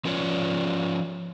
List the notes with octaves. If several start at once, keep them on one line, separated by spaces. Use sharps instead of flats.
F3 C#4 F4 B4 C#5 D5